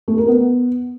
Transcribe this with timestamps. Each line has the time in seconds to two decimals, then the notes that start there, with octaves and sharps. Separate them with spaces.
0.08 A3
0.18 A#4
0.28 B3